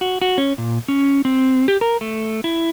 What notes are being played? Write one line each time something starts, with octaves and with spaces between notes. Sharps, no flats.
F#4
F#4
C#4
A#2
C#4
C4
G4
A#4
A3
E4